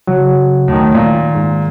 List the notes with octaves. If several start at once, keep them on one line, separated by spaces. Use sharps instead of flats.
C#3 F#3
D2 A2 D#3
A#2 D#3
G#2